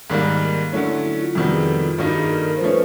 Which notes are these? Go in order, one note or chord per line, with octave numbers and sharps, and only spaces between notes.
G#2 D#3 G3 A#3
D3 F#3 A3 C#4 E4
E4
E4
F4
F2 C3 D#3 G3 B3 F#4
G#4
A4
F4
G2 D#3 G3 A#3 D#4 F#4
G#4
A4
A#4
C5
F3 A3 C#4 B4